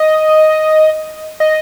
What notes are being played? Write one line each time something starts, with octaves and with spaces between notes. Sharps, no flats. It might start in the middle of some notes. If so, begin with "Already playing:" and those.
Already playing: D#5
D#5